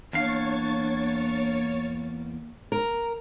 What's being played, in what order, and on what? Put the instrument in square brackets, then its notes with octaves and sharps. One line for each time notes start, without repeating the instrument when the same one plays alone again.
[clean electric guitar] E2 F5 [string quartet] A#3 [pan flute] D4 [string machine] C#5 C#6 A6
[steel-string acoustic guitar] A#4